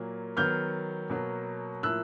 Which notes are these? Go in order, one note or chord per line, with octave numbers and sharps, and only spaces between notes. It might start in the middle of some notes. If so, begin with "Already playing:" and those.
Already playing: A#2 F#3 A#3
D#3 F#3 B3 F6 G6
B2 F#3 A#3
A2 F3 A#3 E6 F#6